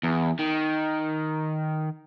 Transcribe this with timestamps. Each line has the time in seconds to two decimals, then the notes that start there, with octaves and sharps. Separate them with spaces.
0.03 E2
0.39 D#3